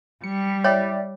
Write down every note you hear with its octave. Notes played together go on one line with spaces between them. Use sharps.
G3 C#7
E4 G4 C#5 D5